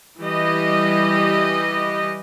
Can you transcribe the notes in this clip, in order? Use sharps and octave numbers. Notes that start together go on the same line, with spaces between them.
E3 G3 G4 D#5